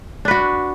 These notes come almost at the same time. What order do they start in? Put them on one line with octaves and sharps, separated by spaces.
D4 B4 F#4